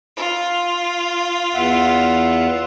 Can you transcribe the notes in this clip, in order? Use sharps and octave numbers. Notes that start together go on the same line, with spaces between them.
F4
E2 E5 F#5